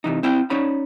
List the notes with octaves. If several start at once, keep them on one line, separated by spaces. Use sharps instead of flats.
C3 E3 D#4
C4 E4 G5
C#4 D#4 C#5 B5